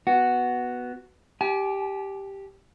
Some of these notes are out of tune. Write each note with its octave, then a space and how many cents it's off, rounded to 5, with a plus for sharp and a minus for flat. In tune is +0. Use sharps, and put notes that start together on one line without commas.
B3 +0 F#4 +0
G4 +0 G#5 +45